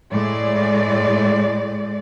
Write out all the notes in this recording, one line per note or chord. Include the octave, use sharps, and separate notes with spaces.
A2 G#3 D5